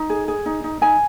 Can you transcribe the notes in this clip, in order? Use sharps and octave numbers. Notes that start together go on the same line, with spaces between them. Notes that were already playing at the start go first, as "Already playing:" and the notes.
Already playing: D#4
G#4
G#4
D#4
D#4
D#4 G#5